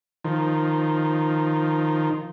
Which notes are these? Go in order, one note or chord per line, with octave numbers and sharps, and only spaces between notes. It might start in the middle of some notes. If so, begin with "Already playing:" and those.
D#3 F3